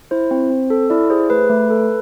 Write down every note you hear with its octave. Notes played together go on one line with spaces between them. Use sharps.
E4 C5
C4
C4
A4
E4 D5
G#4 C5
A3 B4
A3
A4